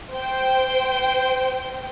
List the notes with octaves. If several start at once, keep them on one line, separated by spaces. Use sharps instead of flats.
C5 G5